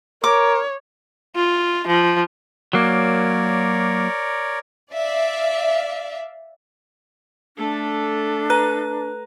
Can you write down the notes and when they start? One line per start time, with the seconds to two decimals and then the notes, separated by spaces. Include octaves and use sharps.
0.24 A#4 C#5 D6
1.36 F4
1.87 F3
2.73 F#3 A#3 A#4 C#5 D5
4.93 D5 E5 F5
7.57 A3 D4 A4
8.50 B4 A#5 F#6